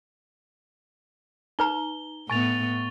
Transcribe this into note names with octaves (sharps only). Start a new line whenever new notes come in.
D#4 B4 A#5 G7
A2 B3 G#5 C#6 A6 F7